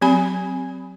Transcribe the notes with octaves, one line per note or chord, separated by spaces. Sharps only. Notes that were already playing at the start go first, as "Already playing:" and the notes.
F#3 C4 G4 G#5 B5